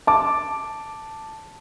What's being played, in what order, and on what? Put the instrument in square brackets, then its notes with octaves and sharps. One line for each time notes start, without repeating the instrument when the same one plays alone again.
[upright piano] A5 D6